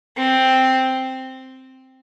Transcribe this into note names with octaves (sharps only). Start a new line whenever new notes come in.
C4